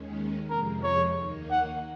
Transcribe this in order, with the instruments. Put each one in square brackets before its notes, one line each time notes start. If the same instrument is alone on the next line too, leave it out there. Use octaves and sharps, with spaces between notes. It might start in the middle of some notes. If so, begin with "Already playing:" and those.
Already playing: [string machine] D#2 D#3 G#3 C#4
[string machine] F2 C3 F3 G#3 [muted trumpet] A#4
[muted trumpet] C#5
[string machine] D#2 D#3 A#3 D#4
[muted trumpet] F#5